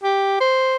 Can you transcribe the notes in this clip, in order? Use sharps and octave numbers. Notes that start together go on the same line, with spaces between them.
G4
C5